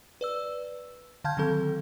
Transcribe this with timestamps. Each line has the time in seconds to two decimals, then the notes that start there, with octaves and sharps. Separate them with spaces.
0.21 B4 D5 E6
1.24 D3 F5 A5 F6 G6 G#6
1.37 D3 D#3 F#3 C4 A4 G6